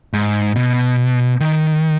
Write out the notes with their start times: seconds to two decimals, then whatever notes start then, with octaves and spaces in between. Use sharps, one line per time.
0.13 G#2
0.56 B2
1.40 D#3